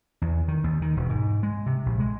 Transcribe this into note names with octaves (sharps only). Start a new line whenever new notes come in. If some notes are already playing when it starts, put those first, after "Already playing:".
E2
D#3
D#2
D#3
E1
G#2
G#3
C3
A#1
G#3